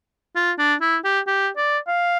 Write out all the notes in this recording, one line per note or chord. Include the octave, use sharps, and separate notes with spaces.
F4
D4
E4
G4
G4
D5
F5